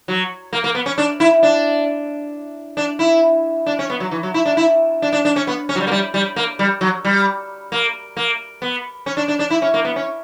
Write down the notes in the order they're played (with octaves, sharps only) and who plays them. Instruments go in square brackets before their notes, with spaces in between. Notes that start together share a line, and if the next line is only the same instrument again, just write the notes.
[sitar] F#3
A#3
A#3
B3
C#4
D4
E4
D4
D4
E4
D4
C#4
B3
F#3
E3
F#3
E4
D4
E4
D4
D4
D4
C#4
B3
C#4
F#3
G3
A#3
G3
G3
A#3
G3
F#3
G3
A#3
A#3
B3
C#4
D4
D4
D4
E4
C#4
A#3
B3
C#4